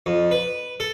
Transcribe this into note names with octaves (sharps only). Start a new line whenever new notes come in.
F2
B4
A4